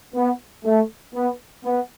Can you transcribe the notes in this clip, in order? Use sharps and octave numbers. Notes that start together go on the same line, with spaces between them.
B3
A3
B3
B3